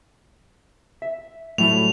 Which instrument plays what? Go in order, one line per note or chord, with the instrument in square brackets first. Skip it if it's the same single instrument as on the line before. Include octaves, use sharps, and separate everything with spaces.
[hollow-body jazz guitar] E5
[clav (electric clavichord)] A2 E4 A4 [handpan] F#3 G3 F#4 [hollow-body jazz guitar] A3 [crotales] F7